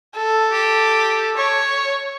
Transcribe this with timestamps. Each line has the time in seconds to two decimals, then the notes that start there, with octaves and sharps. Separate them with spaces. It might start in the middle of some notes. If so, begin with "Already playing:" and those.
0.16 A4
0.51 G4
1.37 C#5 C#6